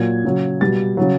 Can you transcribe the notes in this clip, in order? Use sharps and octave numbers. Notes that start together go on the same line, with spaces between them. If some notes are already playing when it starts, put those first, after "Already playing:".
Already playing: A#2 F#3 G#6
C#3 F#3
B2 G3 A6
C#3 F#3